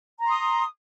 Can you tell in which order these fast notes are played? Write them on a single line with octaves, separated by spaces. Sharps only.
A#5 C6 D#6